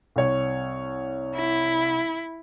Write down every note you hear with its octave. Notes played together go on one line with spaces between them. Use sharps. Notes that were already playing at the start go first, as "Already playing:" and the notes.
C2 C#5
E4